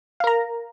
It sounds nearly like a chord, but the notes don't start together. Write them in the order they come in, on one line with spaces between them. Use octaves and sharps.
F5 A#4 A#5